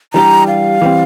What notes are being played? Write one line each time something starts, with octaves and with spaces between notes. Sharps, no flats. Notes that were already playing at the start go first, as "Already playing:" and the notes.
E3 G3 D4 G4 A#5
F5
E3 G3 C4